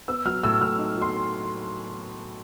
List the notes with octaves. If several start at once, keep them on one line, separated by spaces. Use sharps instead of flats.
B3 E6
F#3 F6
A2 E6
A2 F6
D#4
F#3
C6